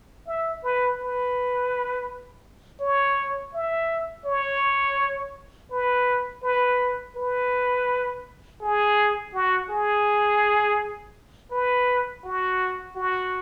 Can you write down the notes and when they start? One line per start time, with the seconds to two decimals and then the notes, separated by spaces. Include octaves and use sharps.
0.27 E5
0.64 B4
0.99 B4
2.80 C#5
3.54 E5
4.26 C#5
5.71 B4
6.43 B4
7.16 B4
8.62 G#4
9.34 F#4
9.70 G#4
11.51 B4
12.24 F#4
12.96 F#4